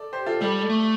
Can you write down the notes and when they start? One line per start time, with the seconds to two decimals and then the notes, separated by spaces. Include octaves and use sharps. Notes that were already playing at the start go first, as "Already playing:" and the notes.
Already playing: A4 D5
0.13 G4 C5
0.26 F4 A4
0.41 G3 A4 D5
0.60 A4 D5
0.69 A3